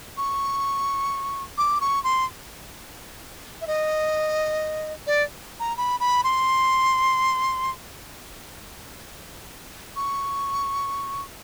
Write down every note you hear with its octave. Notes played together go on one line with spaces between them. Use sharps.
C#6
D6
C#6
C6
E5
D#5
D5
A#5
B5
B5
C6
C#6